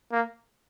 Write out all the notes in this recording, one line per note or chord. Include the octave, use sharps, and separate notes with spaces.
A#3